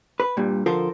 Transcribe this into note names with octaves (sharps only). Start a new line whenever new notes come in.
B4
G2 A#2 G3
D3 F3 F4 A4 A#4 C5